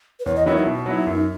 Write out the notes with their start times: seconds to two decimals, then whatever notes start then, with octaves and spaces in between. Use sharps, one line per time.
0.20 B4
0.26 E2 C#5
0.36 D#5
0.46 D#3 F#3 B3 E4 C#5
0.56 D#4
0.66 B2
0.86 F#3 B3 E4
1.07 F#2